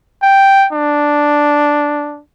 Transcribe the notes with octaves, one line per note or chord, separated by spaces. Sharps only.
G5
D4